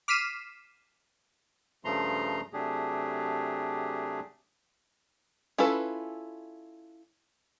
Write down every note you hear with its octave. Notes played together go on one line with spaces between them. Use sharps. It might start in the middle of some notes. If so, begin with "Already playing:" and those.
D6 F6 B6 C7 D#7 E7
G2 C#3 F3 A3 A#5 C6
C3 F#3 A3 D4 G4 G#4
C#4 E4 F4 A4 B4